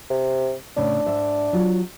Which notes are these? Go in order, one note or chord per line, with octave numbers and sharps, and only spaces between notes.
C3
A2 C#3 D4
G#2 E5
F#3 F4